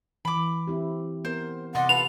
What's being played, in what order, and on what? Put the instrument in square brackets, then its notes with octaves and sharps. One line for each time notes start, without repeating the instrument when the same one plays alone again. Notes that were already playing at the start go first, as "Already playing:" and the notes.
[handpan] E3 [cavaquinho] B5 D6
[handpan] C4 E4 G4
[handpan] B3 A#4 [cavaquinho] C5
[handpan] C3 [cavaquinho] D5 D#5 C6 [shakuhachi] F#5
[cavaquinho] F4 A4 B4 [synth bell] F7